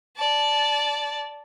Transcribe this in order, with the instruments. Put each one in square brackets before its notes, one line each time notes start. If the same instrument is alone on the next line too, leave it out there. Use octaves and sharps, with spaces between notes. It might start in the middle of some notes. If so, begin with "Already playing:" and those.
[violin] D5 A5